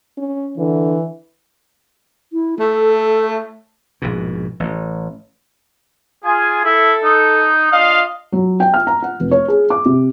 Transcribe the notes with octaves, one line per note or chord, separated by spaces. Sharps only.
C#4
D3 E3
E4
A3 A4
A#1 G#2 B2
A1
F4 G#4 G#5
E4 A4
D#4
D4 F4 D#5 F5
F#3
G5
F6
A#5
F#5
F1
C#5
G#4
D6
C3